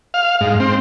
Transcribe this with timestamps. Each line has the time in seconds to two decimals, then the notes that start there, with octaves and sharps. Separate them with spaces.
0.14 F5
0.41 G#2
0.60 C4